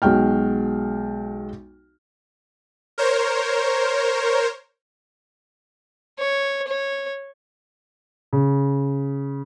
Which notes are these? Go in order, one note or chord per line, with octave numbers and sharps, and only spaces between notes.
B1 G#3 F#4 G5 F6
A#4 C5 C#5
C#5
C#5
C#3